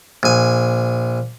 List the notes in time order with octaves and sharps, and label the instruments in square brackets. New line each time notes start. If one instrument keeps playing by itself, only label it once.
[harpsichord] A#1 G#5